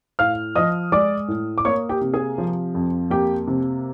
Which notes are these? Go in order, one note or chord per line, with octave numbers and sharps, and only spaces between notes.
A2 F5 F6
F3 D#5 D#6
G#3 D5 D6
A2
D6
A#3 C#5 C#6
G4 G5
C3
G#4 G#5
F3
F2
A#3 G4 G5
C3